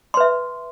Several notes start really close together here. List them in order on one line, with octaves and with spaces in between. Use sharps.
C6 B4 E5